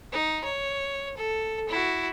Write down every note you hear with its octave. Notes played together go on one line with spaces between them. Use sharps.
D#4
C#5
A4
E4 F#4